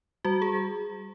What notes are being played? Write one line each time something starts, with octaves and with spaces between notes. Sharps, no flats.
G3 F#4
G#4